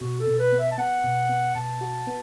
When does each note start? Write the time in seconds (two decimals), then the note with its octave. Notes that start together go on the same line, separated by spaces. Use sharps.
0.01 B2 F#4
0.20 A4
0.27 B2
0.39 B4
0.52 B3
0.59 E5
0.72 A5
0.78 B3 F#5
1.04 B2
1.29 B3
1.55 B2 A5
1.81 F#4
2.07 B3